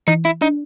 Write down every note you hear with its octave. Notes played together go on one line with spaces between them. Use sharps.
E3 D#4
E4
D4 D#4